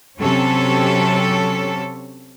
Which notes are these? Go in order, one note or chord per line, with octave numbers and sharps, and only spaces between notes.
C3 F#3 C#4 G4 A4